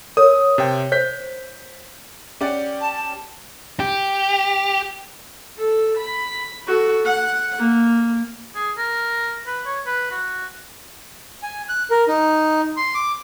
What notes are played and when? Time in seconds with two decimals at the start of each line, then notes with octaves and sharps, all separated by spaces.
0.17 A#4 C#5 D#6
0.58 C3 G5
0.92 C5 G6 B6
2.41 C#4 G4 D5 F#5
2.81 A5
2.93 A5
3.80 G4
5.57 A4
5.97 B5
6.67 F#4 A4
7.05 F#5
7.58 A#3
8.55 G#4
8.78 A#4
9.47 B4
9.66 C#5
9.86 B4
10.11 F#4
11.43 G#5
11.69 F#6
11.91 A#4
12.08 D#4
12.77 C6
12.94 D6